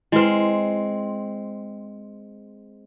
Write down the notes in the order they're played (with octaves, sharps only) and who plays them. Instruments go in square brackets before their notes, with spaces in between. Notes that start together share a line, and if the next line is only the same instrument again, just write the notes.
[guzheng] G#3 C4 [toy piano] E4 B4